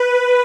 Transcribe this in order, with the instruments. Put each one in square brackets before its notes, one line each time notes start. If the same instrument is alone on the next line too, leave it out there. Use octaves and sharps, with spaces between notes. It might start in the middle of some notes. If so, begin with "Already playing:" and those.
Already playing: [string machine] B4